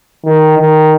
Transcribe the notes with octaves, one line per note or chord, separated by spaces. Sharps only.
D#3
D#3